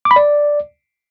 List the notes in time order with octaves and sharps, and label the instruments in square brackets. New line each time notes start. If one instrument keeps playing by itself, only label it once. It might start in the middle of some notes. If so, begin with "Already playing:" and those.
[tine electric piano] D6
B5
D5